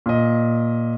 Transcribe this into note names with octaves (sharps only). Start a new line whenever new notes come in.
A#2 D#5